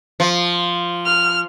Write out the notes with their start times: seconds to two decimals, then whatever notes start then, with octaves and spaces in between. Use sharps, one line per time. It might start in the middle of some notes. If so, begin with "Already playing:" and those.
0.20 F3
1.05 F6